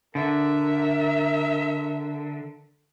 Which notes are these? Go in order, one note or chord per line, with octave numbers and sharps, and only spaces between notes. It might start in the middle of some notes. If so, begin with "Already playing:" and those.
D3 A#4 E5